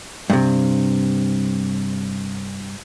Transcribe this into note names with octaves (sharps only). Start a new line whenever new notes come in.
G2 C3